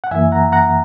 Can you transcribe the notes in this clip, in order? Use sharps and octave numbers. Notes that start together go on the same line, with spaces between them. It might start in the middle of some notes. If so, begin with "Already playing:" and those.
F#5
F#2 E3 A#3 E5 G#5
F#5 A#5
F#5 A#5